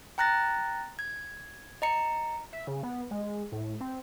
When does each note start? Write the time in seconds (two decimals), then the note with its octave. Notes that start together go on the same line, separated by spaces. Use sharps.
0.18 G5 A#5 F#6 A6 A#6
0.99 G#6
1.82 D#5 A#5 C#7
2.53 E5
2.67 C#3
2.83 B3
3.11 G#3
3.52 A2
3.80 C4